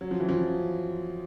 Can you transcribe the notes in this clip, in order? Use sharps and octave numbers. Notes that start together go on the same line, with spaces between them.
F#3
F3
E3
F3